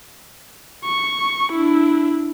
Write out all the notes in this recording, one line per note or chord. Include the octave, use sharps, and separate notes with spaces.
C#6
D4 E4